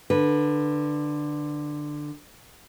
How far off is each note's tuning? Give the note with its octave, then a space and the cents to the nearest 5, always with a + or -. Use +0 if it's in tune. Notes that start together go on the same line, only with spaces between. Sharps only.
D3 +15 B4 +0